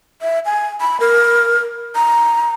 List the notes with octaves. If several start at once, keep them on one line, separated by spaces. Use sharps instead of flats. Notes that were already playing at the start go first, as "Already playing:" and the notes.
E5
G#5
B5
A#4
A#5